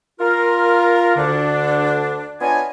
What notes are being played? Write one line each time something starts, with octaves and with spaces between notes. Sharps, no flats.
F4 A#4
D2 D3 D4
B3 D4 F4 C#5 D#5 G#5